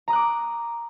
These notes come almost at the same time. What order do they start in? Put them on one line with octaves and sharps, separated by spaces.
A#5 D#6 F#6 D6